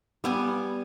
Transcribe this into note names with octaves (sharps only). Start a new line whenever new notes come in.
G3 B3 G#5